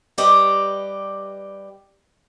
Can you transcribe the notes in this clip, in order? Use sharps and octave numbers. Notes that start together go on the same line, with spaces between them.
G3 G4 B4 D5 D#5